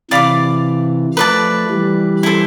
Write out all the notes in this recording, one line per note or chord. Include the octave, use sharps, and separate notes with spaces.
C3 E3 D5 F5 B5 D6
F3 A3 B4 D5 A5
E3 G3
E4 A4 C5